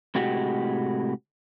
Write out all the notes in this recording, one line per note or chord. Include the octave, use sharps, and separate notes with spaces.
A2 C3 G#3 F#4 G4